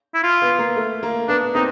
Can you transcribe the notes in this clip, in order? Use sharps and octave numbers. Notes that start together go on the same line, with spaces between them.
E4
F4
B3
A#3
A3
A#3
B3 D4
C4 D#4